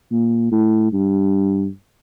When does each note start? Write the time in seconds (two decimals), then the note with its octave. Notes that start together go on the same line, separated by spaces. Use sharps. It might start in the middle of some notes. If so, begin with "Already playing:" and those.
0.11 A#2
0.51 A2
0.93 G2